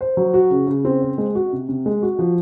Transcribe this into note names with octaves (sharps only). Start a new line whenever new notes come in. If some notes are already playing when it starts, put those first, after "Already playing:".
C5
F#3
F#4
C#3
C#3
C4
C5
G#3
F#4
C3
C3
G#3
F#4
F3